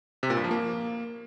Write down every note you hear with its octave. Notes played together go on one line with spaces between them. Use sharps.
C3
A#2
G2
F3
A#3